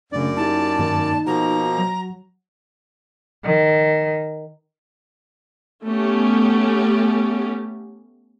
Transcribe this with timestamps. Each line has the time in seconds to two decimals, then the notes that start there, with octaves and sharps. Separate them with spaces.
0.12 F#2 C#3 A3 D4 D5
0.37 A#3 D#4 E4 G4 A5
0.79 G2 D#3 A#3
1.26 B2 F3 A#3 F#4 A#5
1.78 F#3
3.44 D#3
5.84 A3 B3 C#4 G4